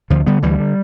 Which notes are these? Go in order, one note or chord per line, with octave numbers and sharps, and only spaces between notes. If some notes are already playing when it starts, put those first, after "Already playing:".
D2 D3 F3
D3 G3 B3
D2 E3 G3
D3